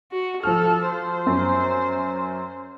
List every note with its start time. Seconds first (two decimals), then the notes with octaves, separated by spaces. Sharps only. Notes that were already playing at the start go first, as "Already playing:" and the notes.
0.12 F#4
0.43 F3 A4 F6
0.89 C5
1.26 F#2